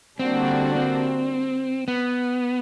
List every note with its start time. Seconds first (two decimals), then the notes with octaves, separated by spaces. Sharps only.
0.19 D3 G3 A#3 C4 D4 F#4
0.75 C4
1.88 B3